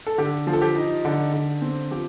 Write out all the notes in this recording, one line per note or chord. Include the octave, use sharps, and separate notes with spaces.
A4
D3 G4
F3
A4
G4
D#4
D3
D3
C4
F3 G4